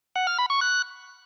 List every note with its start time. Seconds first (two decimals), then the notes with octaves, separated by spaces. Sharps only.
0.16 F#5
0.27 F6
0.38 B5
0.50 C#6
0.61 F#6